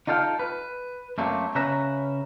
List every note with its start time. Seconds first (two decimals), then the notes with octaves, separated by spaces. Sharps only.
0.07 D#4 F4 A4 F5 G5
0.39 B4
1.18 F#2 A3 A#3 C4
1.55 C#3 C#4 B4 E5 A#5